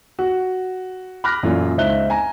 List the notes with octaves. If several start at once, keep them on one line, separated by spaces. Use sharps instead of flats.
F#4
B5 D6 F6 F#6 A#6
F#2 A#2 E3 F4 A4 D5
C#2 C4 D#4 E5 F#6 G7
G#5 A#5